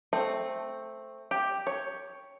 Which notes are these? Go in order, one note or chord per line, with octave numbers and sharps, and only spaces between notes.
A3 C4
G4
C#5